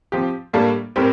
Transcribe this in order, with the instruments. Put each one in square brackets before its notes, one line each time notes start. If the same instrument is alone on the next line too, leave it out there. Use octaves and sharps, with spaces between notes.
[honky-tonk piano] F3 C4 G4
A2 G3 A#3 D4 A4
A2 G3 C4 G4 A#4